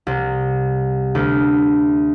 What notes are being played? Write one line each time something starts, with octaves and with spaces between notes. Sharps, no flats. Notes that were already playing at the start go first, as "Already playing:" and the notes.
C2
D2